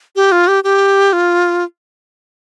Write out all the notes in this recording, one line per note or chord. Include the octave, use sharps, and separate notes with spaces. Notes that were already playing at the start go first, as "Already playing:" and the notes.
G4
F4
G4
G4
F4